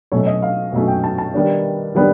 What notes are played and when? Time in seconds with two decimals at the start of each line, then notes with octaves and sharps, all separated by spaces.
0.12 B2 F#3 A3 C#4 C#5
0.27 D#5
0.42 F5
0.73 B2 F#3 A3 C#4
0.88 G5
1.04 A5
1.18 A5
1.34 D#3 G3 B3 D4
1.95 D#3 G3 B3 D4